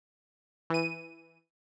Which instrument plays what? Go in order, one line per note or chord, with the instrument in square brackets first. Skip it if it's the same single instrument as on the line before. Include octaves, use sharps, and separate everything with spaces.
[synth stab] E3 D#7